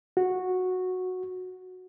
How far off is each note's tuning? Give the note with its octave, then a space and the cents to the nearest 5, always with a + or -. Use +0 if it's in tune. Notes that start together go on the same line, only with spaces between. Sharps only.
F#4 -10